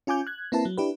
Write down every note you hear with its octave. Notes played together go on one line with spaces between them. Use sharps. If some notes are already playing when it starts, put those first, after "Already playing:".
C#4 F4 G#5 D6 G6
F#6 G#6
A#3 C4 E4 B4 A5
F#3
D4 E4 G4 B4